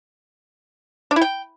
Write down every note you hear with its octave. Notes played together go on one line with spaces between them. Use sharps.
D4
E4
G5